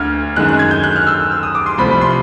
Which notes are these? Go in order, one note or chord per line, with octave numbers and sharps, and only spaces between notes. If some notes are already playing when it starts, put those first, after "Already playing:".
Already playing: D2 F6 G#6
F#2 D#3 G#3 F#6
F#6
G#6
G6
F#6
F6
E6
E6
E6
D#6
D6
C6
C2 C3 F3 A3 B5
B5
C6